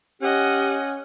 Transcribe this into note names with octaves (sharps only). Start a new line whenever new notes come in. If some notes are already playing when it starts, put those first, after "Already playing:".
C#4 G4 D#5 F#5